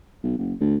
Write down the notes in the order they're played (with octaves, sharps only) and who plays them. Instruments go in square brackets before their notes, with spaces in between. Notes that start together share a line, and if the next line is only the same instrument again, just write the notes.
[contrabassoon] B1
F#1
D2